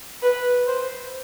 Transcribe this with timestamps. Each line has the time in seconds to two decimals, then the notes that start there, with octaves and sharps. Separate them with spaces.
0.23 B4
0.67 C5